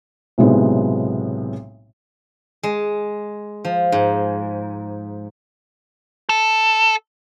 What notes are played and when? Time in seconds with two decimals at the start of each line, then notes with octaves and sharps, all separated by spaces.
0.38 B1 A2 C3 F#3 G#3 B3
2.63 G#3
3.65 F3
3.92 G#2
6.29 A4